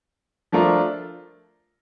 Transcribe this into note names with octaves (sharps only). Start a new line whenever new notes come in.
F3 A3 D4 F4 A#4